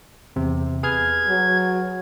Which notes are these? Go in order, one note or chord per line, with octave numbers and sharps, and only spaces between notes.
E2 C3
G#4 B4 F6 G#6
F#3